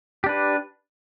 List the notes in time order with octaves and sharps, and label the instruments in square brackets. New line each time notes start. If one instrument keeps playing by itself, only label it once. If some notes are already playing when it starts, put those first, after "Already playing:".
[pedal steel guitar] G4
D4
B4